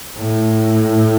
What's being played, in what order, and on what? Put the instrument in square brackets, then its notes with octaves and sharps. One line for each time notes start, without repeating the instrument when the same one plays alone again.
[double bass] A2